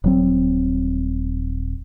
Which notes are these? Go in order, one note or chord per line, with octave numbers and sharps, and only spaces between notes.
D#1 F#3 C4